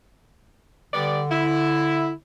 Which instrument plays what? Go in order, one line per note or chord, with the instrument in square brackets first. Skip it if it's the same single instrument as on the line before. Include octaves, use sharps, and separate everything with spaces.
[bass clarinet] D3 [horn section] G3 B3 D5
[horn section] E4